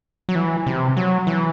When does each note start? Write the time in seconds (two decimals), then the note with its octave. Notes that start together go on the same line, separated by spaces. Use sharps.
0.29 F#3
0.35 E3
0.66 C3
0.97 F#3
1.27 E3